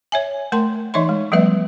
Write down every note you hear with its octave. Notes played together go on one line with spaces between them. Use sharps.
C#5 E5 G#5
A3 A#4 G5 A5 C6
E3 D#4 C#5 D#5 E5 C6
G#3
F3 G3 A3 B3 B4 E5